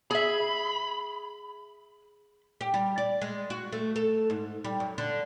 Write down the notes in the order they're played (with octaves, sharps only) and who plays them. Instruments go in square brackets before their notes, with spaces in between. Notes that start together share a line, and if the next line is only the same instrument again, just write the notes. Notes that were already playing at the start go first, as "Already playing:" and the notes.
[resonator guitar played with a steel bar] G#4 E5 [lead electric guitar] B5
[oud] G4
G3
D5
G#3
F#4
A3
A4
G#2
G3
F#2
D3